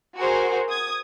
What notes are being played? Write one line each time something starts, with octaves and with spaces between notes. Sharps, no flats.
F#4 G#4 A#4 C5
D#6 G#6